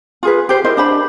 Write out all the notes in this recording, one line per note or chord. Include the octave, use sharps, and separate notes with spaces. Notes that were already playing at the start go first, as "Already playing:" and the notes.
F4 G#4 B4
G4 C5
E4 A#4 C5 D#5
D4 C5 B5